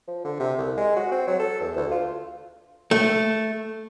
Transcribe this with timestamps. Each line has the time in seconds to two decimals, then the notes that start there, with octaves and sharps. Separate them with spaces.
0.08 F3
0.25 D3
0.40 C3
0.59 C2
0.77 G#3
0.96 F#4
1.12 C4
1.28 F#3
1.40 A4
1.61 E2
1.77 D2
1.92 F4
2.91 A3